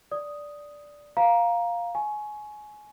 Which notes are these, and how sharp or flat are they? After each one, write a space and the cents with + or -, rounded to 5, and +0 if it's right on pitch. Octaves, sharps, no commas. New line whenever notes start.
D5 -5 D#6 +0
C5 +0 F5 +0 A#5 +10
G#5 +20 C#6 -5